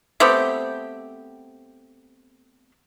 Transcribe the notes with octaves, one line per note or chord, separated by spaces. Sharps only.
A3 B3 C4 G4